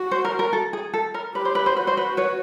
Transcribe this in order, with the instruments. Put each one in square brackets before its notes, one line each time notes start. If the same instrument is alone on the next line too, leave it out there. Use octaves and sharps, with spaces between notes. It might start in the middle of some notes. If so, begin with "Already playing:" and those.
Already playing: [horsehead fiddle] F#4
[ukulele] C5
A#4
A#4
A4
G#4
A4
A#4
[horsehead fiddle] G4 [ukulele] B4
[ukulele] C5
B4
C5
[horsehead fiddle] F#4 [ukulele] B4
[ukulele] C5
B4
B4 C#5